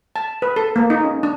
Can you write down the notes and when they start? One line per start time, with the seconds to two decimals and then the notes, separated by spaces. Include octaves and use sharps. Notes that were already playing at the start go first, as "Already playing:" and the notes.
0.16 A5
0.42 B4
0.56 A4
0.76 A#3
0.90 D#4
1.04 C#4
1.23 D4